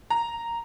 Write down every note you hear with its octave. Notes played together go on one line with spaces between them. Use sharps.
A#5